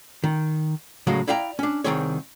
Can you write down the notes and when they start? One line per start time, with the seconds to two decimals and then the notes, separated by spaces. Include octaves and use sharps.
0.24 D#3
1.07 A2 C#3 F#3 G#3 F5
1.28 E4 D5 F5 G5 A#5
1.59 C#4 D4
1.84 C2 G2 D#3 C4 G#4 C#5